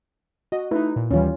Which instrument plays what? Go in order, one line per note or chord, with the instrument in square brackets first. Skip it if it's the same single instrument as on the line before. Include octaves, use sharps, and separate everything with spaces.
[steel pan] F#4 [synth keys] D#5
[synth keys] A3 D#4 [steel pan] E4 B4
[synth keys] A#2
[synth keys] D#2 E3 G3 [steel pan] C#4 F4